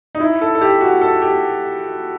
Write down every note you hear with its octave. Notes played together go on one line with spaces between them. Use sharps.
D#4
E4
A4
A4
G4
F#4
A4
G4